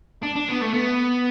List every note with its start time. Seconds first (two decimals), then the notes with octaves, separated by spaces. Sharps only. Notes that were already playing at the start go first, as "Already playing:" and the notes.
0.23 D4
0.36 D4
0.48 B3
0.61 A3
0.74 B3